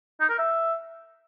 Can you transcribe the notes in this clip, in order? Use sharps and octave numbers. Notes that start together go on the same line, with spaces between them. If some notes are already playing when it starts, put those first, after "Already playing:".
D#4
A#4
E5